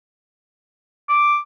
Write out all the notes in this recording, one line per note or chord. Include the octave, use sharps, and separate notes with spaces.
D6